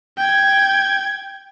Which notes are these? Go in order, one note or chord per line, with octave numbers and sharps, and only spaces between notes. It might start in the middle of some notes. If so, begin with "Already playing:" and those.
G5 G#6